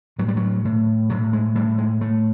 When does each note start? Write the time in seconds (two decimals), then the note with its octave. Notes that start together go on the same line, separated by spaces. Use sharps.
0.19 A2 F#3
0.28 G3
0.37 F#3
0.65 A2
1.10 A2 F#3
1.33 G#3
1.55 A2 G3
1.78 G#3
2.01 A2 A3